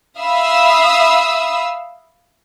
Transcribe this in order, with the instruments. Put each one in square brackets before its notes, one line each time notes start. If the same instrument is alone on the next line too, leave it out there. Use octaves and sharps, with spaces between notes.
[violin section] E5 F5 B5 D#6 E6